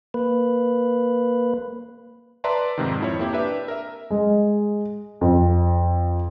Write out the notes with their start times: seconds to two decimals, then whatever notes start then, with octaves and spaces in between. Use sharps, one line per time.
0.14 A#3 B4
2.44 B4 D5 E5 A5 A#5 C6
2.78 F2 G#2 C3 D#3
3.01 F2 E4 C#5
3.19 A#3 C4 E4 G4
3.33 D4 G4 B4 E5
3.68 A#4 E5
4.11 G#3
5.21 F2